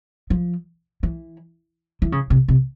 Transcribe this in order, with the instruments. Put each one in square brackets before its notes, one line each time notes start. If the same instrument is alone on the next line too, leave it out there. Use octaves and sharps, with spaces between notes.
[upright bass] F3
E3
E3
C#3
C3
C3